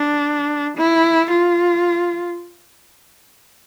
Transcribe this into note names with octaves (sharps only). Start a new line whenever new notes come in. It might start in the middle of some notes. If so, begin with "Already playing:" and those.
Already playing: D4
E4
F4